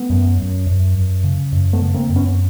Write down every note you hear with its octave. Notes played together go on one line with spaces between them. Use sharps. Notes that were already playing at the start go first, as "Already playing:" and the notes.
Already playing: A3 B3
F#2
F#2
F#2
F#2
C#3
F#2
A3 B3
C#3
A#3 C4
F#2
B3 C#4